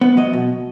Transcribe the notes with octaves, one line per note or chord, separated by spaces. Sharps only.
B3
F#3 D#5
B2